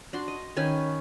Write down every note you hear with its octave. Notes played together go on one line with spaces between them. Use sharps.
D4 F#4 C6
D#5
D#3 C#4 B4 G#5